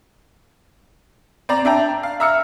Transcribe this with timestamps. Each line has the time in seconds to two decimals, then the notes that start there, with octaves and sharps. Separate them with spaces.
1.49 C4 D5 A#5
1.65 D4 E5 G5 A#5
2.03 F5
2.20 E5 A#5 E6 F6 C#7